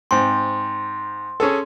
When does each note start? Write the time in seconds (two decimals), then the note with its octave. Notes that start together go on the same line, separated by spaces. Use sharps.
0.11 G#2 C4 C6
1.40 C#4 G#4 A4